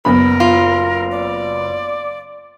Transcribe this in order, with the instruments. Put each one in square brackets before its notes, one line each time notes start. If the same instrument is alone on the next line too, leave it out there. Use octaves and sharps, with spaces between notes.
[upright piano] F#1 B3 B5 [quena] A#4
[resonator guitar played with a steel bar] F4
[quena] D5